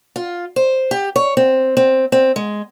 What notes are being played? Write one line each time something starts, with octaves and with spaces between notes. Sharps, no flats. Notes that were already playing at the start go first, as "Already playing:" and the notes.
F4
C5
G4
C#5
C4
C4
C4
G#3